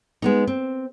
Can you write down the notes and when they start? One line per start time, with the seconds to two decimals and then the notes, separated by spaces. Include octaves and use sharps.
0.22 G#3 B3 D#4
0.47 C4